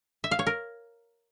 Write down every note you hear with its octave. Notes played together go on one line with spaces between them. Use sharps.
E5
F5
C#5
A#4